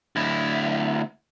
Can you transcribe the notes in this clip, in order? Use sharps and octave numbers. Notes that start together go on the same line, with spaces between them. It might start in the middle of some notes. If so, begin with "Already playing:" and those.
D2 E4